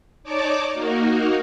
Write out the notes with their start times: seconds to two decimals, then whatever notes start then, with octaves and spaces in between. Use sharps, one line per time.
0.24 D#4 C#5 D5 A5 D6
0.74 A#3 D#4 F#4 A#4